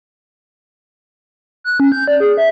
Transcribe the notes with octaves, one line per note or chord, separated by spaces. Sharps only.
F#6
C#4
G6
D5
G#4
E5